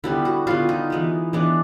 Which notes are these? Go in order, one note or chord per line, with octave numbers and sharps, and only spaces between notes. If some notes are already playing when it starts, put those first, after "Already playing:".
D3 G3 B3 E4
F#4
D3 G3 B3 F4
D#4
E3 G#3 B3
E3 G#3 B3 D4